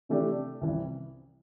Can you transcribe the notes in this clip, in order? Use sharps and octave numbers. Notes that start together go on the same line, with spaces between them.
C3 E3 A3 D4 G4
C2 C3 E3